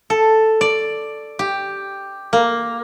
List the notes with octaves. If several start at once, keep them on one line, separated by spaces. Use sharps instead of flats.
A4
D5
G4
A#3